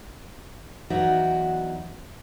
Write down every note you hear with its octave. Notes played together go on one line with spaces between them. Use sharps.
E2 F#3 D#4 F#4 D5 E5